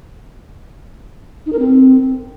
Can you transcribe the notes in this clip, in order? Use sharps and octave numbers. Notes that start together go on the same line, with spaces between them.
D#4
A#4
C4